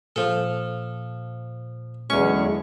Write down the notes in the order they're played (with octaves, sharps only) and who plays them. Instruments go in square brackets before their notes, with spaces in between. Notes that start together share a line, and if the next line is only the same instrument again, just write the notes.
[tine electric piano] A#2 [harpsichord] F3 A4
[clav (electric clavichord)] E2 C#4 [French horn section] D3 F#3 G#3 [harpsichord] C#6